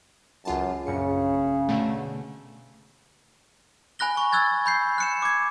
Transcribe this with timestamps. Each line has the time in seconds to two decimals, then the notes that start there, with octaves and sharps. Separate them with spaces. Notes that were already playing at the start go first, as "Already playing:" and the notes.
0.45 C#2 F#2 F4 A5
0.87 A#1 F#2 C#3 C#7
1.69 B2 D3 A3
3.99 G#5 B5 F#6 A#6 G7
4.17 C#6
4.32 E6 F#6 G#6 A6
4.66 B5 G6 C7
4.98 F#6 C#7 E7
5.22 D6 G#6